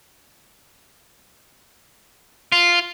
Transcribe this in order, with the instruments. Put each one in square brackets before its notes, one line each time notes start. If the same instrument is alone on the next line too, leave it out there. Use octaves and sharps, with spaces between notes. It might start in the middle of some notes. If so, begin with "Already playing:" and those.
[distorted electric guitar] F4